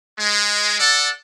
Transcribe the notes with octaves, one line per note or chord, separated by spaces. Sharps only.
G#3
A4 D5 F#5